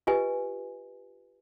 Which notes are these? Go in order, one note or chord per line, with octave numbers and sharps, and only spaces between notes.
F4 G4 B4 D#5 G#5